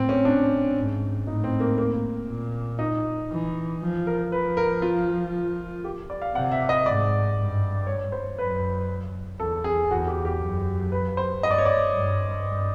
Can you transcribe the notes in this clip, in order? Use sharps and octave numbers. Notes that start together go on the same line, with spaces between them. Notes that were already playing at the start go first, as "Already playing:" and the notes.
Already playing: A2 C4
C#4
D4
G#2
A2 D#4
C4
A#3
A#3
A#2
D#4
E3
F3
A#4
F3 B4
A#4
F4
G4
D5
F5
C3 F#5
E5
D#5
G#2 D5
G2
C#5
C5
F#2 B4
E2 A4
G#4
E2 F#4
G4
G4
F#2
B4
C5
G2 D#5
D5
C#5
D5
G2
G2